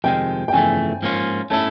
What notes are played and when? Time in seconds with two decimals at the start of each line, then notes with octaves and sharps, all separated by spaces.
0.04 F2 C3 D#3 G#3 G5
0.48 G5
0.53 F2 C#3 E3 A3 G#5
1.02 G#2 F3 A#3 C#4 F4
1.50 A3 C#4 E4 A4 A5